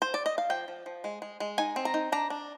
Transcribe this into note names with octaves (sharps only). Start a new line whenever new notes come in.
C5
D5
D#5
F5
F3 G5
F3
F3
G#3
G#3
G#3
D#4 G#5
C4
A#5
D#4
D4 A#5
D4